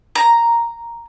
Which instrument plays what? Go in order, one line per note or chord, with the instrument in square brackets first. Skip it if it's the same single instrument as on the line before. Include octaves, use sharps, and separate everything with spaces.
[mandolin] A#5